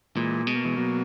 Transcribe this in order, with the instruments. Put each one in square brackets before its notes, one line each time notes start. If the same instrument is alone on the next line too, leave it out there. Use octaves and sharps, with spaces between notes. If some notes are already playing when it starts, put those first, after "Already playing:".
[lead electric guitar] A#2 [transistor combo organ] E3 G#3
[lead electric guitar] B2 [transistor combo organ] G#3
[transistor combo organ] A#3
E3 G#3
F#3 A#3